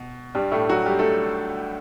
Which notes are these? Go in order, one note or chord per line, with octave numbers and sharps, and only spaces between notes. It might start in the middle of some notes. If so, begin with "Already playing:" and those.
Already playing: B2
G2 G3
A2 A3
F#3 F#4
G3 G4
A3 A4